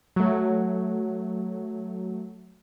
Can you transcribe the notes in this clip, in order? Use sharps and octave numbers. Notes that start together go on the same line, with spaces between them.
F#3 A3